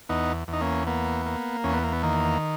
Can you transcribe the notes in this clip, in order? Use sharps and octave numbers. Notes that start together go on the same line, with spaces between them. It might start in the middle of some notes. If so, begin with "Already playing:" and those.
E2 B3 D#4
E2
D#4
A#3 C#4
A#3 B3
A#3
E2 C#4
B3
A#3
B3
D#3 A#3